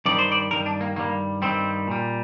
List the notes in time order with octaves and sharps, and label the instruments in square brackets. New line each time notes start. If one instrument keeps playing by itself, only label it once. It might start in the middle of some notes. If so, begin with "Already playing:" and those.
[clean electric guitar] G2 D#3 G3 D5
C5
D5
G2 D#3 G3 A#4
D4
A#3
G2 D#3 G3 A#3
G2 D#3 G3 C4
A#2 G3